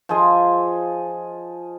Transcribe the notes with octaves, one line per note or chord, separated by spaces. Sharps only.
F3 F4 G#4 D#5